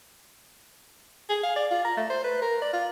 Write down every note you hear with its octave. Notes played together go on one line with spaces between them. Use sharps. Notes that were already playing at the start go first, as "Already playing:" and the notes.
G#4
F5
D5
F4
A#5
A3
C5
B4
A#4
D5
F4